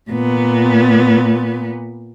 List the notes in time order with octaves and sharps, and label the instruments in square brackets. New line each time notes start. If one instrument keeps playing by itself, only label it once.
[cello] A#2 B3